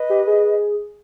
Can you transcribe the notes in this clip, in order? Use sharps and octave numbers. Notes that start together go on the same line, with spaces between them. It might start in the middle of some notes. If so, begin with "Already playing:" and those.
Already playing: B4 D#5
G4
G#4